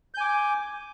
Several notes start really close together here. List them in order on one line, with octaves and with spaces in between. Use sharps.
G6 G#5 D6